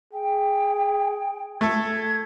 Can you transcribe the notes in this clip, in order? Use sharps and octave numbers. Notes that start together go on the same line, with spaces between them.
G#4 G5
A3 A4 G#6